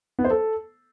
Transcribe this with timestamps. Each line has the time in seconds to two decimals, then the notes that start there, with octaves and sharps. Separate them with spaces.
0.19 B3
0.24 C5
0.30 A4